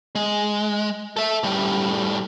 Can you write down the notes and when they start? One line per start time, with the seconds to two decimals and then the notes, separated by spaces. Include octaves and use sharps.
0.15 G#3
1.17 A4 E5
1.44 A2 G3